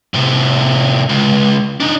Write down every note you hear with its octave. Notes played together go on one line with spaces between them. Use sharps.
A2 C3
C#2
D4 D#4